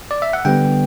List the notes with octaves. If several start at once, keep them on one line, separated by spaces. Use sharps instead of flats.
D5
E5
F#5
D3 G3 B3 G5